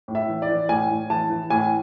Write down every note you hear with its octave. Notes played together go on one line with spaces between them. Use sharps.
A2
E5
E3
D5
E3
A2 G#5
A2
E3 A5
E3
A2 G#5